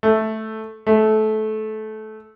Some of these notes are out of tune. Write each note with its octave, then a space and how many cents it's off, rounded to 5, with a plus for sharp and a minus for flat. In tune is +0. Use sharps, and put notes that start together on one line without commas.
A3 -5
A3 -20